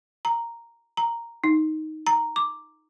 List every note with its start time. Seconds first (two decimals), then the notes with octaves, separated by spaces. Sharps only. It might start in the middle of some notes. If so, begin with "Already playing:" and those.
0.25 A#5
0.97 A#5
1.44 D#4
2.07 A#5
2.36 D6